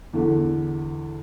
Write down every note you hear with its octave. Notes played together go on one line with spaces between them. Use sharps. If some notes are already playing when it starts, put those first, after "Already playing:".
E2 D3